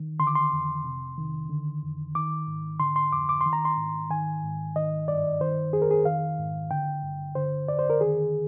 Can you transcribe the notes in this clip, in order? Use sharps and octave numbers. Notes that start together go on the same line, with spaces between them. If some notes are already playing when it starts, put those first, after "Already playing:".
Already playing: D#3
D3 C6
D6
C6
F2
C3
D#3
D3
F2
D#3 D6
G#2
D3 C6
C6
F2 D6
D6
D#3 C6
A#5
C6
G#2
D#3 G#5
G#2
D#3 D#5
G2 D5
D#3 C5
F2 G#4
A#4
G#4
D#3 F5
G#2
D3 G5
G2
D3 C5
F2 D5
C5
A#4
D#3 G#4